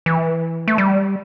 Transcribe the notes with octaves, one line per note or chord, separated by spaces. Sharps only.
E3
A3
G3